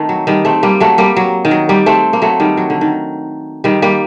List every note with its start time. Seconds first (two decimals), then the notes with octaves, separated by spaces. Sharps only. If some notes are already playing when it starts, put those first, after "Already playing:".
Already playing: D#3 A3 C4
0.09 F#3
0.27 D#3 G3
0.45 A3 C4
0.63 G3 A#3
0.80 F#3 A3
0.98 G3 A#3
1.17 F#3
1.45 D#3
1.51 F#3
1.69 G3 A#3
1.86 A3 C4
2.13 A#3
2.22 F#3 A3
2.40 D#3 G3
2.57 F#3
2.70 D3
2.81 D#3
3.64 D#3 G3
3.82 G3 A#3